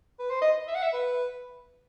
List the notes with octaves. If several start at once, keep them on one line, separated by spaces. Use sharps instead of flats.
B4
C5
D#5
E5
F#5
E5
B4